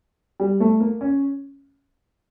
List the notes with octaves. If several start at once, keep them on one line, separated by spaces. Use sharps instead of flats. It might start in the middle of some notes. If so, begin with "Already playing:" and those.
G3
A3
A#3
C#4